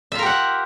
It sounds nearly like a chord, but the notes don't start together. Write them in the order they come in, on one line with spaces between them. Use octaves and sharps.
E5 F4 A#4 G4 F#5